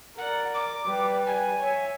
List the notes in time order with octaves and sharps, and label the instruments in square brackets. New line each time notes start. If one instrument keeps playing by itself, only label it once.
[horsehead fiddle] A#4 D5 [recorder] F#5
[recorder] D6
[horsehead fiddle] G3 B4
[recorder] G#5
[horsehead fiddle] C#5 E5